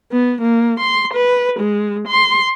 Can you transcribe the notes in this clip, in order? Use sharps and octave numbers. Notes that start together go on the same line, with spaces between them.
B3
A#3
C6
B4
G#3
C6